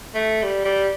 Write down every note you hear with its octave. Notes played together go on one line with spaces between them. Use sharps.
A3
G3
G3